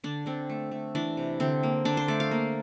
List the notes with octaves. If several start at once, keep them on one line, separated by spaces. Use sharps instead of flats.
D3 D4
D3 C4
A3
A3
E3 D4
C3
D3 C4
A#3
D3 D4
C5
A3 D5
F5
A#3